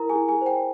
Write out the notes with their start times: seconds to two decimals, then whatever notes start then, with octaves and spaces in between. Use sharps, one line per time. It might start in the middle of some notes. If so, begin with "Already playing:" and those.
Already playing: E4 A#4 A#5
0.09 G#4 G#5
0.15 E4
0.28 G#4 G#5
0.41 C5
0.46 G5